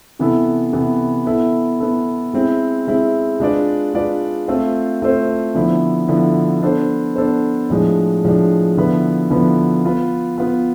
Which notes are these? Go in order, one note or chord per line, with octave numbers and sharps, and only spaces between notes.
C3 E3 B3 E4 A4
C3 E3 B3 E4 A4
B3 E4 A4
B3 E4 A4
G#3 C4 E4
G#3 C4 E4
G#3 D4 F4 B4 D5
G#3 D4 F4 B4 D5
A3 C4 F4 A4 C5
A3 C4 F4 A4 C5
D3 F3 B3 E4
D3 F3 B3 E4
B3 D4 A4 C5
B3 D4 A4 C5
A2 F3 G#3 D4
A2 F3 G#3 D4
D3 F3 B3 E4 B4
D3 F3 B3 E4 B4
B3 F4 B4
B3 F4 B4